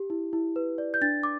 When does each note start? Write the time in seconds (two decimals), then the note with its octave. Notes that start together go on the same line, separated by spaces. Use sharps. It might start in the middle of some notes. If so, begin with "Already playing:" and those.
Already playing: G4
0.10 E4
0.33 E4
0.56 B4
0.78 D5
0.94 G6
1.02 D4 A6
1.23 D6